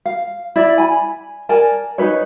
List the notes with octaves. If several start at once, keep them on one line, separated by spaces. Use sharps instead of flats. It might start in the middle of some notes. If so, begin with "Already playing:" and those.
F5
E4 D5
G#5 B5
A#4 D5 G#5 A5
D#4 F4 B4 C#5